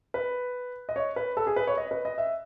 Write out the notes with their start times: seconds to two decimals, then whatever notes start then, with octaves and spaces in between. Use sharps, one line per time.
0.14 B4
0.89 D#5
0.96 C#5
1.16 B4
1.37 A4
1.47 G#4
1.56 B4
1.67 C#5
1.78 D#5
1.91 B4
2.05 D#5
2.18 E5